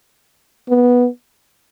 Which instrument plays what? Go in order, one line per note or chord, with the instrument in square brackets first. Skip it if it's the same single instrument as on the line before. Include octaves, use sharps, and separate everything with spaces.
[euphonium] B3